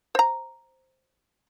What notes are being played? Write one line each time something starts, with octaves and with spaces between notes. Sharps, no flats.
C5 A#5